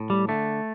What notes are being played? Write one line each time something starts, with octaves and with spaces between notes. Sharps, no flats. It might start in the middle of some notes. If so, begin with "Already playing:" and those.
Already playing: A2
G3
D3 A3